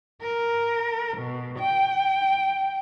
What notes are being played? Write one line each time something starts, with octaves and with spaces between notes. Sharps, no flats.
A#4
B2
G5